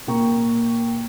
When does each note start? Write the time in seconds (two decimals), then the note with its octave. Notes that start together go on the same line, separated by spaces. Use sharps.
0.07 A#2 A#3 G5 A#5 C#6